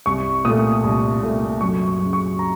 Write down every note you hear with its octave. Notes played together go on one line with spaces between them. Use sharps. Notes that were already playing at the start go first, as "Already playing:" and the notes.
C2 C#6
A#2 A3 D#6
C2
A#2 A3
F#2 C#6
C#6
C#3 F#3
C#6
A#5